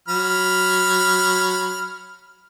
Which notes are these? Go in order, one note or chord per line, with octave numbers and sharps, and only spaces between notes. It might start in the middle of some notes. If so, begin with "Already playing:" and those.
F#3 B5 F6